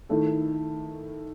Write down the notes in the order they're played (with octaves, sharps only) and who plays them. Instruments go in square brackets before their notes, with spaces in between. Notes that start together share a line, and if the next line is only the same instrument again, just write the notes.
[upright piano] D#3 A3 E4 A4